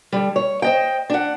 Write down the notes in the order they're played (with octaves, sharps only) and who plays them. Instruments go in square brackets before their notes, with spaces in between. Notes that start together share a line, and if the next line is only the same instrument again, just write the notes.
[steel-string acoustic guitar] D3 G3
C#5
C5 D#5 G5
D4 F#5